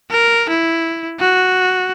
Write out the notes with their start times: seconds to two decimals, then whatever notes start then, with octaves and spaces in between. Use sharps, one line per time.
0.10 A#4
0.49 E4
1.19 F#4